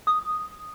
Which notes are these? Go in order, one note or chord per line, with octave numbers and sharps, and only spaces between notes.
D#6